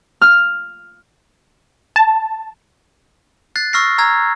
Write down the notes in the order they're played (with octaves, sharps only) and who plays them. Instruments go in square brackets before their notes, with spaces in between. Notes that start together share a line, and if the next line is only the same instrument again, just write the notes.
[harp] F6
[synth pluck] A5
[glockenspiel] F#6 A6 C7
C#6 E6 F6 A#6 C7
A#5 E6 G#6